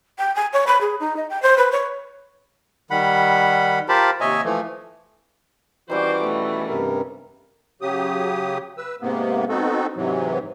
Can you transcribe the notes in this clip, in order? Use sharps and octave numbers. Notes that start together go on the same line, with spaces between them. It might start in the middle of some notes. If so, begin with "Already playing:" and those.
G5
G#5
C#5
B5
G#4
D#4
D#5
G5
C5
B4
C#5
D#3 G3 F#5 B5
F4 G4 A#4 C5 A5 B5
D#2 C3 C#5 D#5 E5 G#5
E3 F3 A3
D#3 E3 G3 C#4 F#4 C5 D6
B2 A3 C#5
G2 C3 A#4
C#3 F#3 G4 D#6
B4 E6
G#2 C3 A#3 B3
B3 C4 D#4 F#4 A4
G#2 C3 E3 F#3